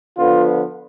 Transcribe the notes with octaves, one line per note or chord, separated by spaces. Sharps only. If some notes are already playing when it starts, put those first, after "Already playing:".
D3 F3 B3 F4